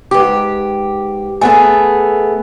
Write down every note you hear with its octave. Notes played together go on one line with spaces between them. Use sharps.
G#2 G4 B4 D6
A3 B3 G#4 G#5